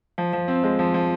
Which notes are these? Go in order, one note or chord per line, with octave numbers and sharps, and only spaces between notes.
F3
F3
C4
G#3
F3
F3